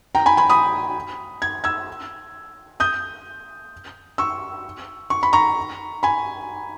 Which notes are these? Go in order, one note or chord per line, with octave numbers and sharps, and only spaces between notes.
G5 A#5
G#5 B5
G#5 B5
B5 D#6
G#6
E6 G#6
D#6 G6
C#6 E6
C#6
B5
A#5 C#6
G#5 B5